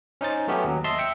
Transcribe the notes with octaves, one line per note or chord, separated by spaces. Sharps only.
C#4 D#4 C5 A6
F#3 A3 B3 C#4 G4
D#2 F#3
D#5 E5 A5 C6
E5 G5 C#7